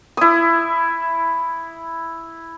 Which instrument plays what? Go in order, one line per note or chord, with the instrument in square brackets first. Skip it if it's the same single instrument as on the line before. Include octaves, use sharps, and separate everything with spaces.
[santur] E4 D#6